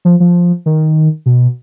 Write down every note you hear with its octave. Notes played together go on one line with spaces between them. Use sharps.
F3
F3
D#3
B2